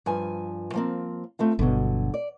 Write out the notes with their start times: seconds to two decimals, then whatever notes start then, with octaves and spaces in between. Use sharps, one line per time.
0.06 G2 F3 G#5
0.74 F3 A#3 C4
1.39 A3 C4 F4
1.59 G1 B2 D3 F#3
2.14 D5